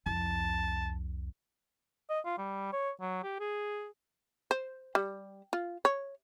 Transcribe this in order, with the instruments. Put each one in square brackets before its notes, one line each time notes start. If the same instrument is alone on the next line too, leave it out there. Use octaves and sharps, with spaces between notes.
[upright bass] C2 F2 [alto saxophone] A5
[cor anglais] D#5
F4
G3
C#5
F#3
G4
G#4
[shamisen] C5
G3
F4
C#5